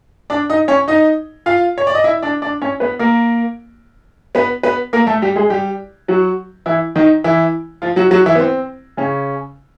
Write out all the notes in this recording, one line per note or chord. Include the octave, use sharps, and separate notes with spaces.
D4 D5
D#4 D#5
C#4 C#5
D#4 D#5
F4 F5
C#5
D5
D#5
E4 E5
D4 D5
D4 D5
C#4 C#5
B3 B4
A#3 A#4
B3 B4
B3 B4
A#3 A#4
A3 A4
G3 G4
G#3 G#4
G3 G4
F#3 F#4
E3 E4
D#3 D#4
E3 E4
F3 F4
F#3 F#4
F#3 F#4
E3 E4
B3
C4
C#3 C#4